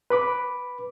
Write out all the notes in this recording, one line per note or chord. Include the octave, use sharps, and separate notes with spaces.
B4 B5 D6